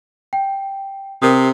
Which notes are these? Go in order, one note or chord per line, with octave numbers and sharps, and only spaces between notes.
G5
C3 A#4 D#6